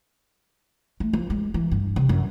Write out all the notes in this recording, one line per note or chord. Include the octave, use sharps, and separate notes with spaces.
A3
F3
G#3
E3
G2
C3
F#2